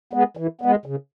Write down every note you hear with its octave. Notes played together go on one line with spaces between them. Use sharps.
G#3 B3
E3
G#3 B3
C#3